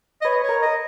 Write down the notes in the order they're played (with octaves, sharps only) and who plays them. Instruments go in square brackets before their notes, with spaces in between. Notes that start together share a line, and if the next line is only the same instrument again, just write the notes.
[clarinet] D#5
[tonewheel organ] B4 [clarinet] C#5
[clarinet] C#5
[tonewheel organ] A#4
[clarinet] D#5